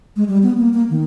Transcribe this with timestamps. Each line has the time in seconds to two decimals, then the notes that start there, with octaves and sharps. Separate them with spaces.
0.16 G#3
0.28 G3
0.43 B3
0.58 A#3
0.73 A#3
0.90 D#3